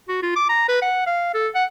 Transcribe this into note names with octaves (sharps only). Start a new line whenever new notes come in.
F#4
F4
D6
A#5
B4
F#5
F5
A4
F#5